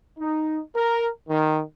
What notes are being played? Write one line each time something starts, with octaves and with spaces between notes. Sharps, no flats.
D#4
A#4
D#3